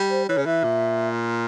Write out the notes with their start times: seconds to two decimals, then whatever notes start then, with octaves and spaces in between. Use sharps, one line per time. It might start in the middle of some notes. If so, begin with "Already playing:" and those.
Already playing: G3
0.10 C5
0.29 E3 C#5
0.38 C#3
0.46 E3 E5
0.64 A#2